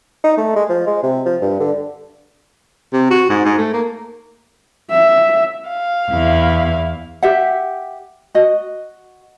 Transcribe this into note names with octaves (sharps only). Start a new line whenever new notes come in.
D#4
A3
G#3
F3
G#3
C3
F3
G2
D3
C3
F#4
G#2
G#2
A3
A#3
E5
F5
E2 E4
G4 E5 F#5
F#4 D#5